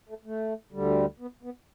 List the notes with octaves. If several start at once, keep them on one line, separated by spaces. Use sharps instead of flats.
A3
A3
D2 D3 G3
B3
B3